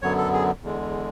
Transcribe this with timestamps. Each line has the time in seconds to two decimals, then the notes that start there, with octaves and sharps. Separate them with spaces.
0.02 F#2 D3 F#3 B3 C#5
0.18 A4
0.33 G#4
0.63 E2 D3 G#3